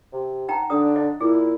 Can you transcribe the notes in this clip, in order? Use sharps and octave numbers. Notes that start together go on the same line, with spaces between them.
C3
D#4 F#5 G5 A#5
D3 D4 D#6
D#5
A#2 E4 G#4